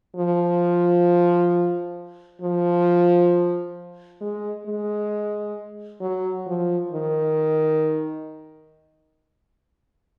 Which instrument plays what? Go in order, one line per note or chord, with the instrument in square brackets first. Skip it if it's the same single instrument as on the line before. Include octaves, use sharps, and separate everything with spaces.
[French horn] F3
F3
G#3
G#3
F#3
F3
D#3